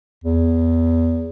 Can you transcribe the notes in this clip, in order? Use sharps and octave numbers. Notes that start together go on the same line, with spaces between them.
E2